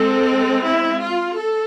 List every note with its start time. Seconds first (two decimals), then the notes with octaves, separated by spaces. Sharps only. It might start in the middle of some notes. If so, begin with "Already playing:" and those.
Already playing: G#3 C4 A4
0.64 E4
1.01 F4
1.36 A4